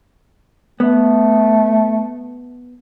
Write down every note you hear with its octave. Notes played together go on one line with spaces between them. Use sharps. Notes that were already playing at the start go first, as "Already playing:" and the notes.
A3 B3